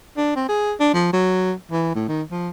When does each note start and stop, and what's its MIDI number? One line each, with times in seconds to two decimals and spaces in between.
0.17 0.35 62
0.36 0.46 60
0.49 0.73 68
0.80 0.88 62
0.94 1.08 53
1.13 1.53 54
1.71 1.91 52
1.95 2.05 45
2.08 2.22 51
2.31 2.50 53